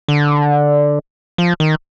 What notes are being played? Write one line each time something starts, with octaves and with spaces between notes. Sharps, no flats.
D3
F3
D#3